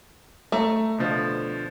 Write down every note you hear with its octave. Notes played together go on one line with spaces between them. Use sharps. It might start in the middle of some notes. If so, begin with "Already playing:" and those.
A3 A#5
B2 D3 F3